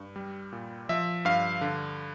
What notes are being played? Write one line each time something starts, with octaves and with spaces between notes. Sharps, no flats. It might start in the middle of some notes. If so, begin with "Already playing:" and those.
Already playing: G2
G3
A#2
F3 E5
G2 F5
D3